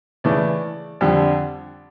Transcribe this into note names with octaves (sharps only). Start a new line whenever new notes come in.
C#3 E3 A3 D5
F2 D3 G3